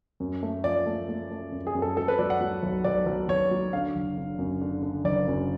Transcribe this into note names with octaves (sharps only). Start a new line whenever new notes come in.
F#2
A3
F3 D5
A3
A3
A3
F#2
G#4
F#2
A4
F#3 A4
B4
F#3 D5
F#5
F#3
B1
B1 D5
B1
B1 C#5
F#3
D3 F5
F#1
D3
F#2
D3
D3
F#1 D5
F#2